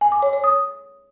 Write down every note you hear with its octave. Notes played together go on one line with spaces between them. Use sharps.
G#5
D6
C#5
C#5
D#6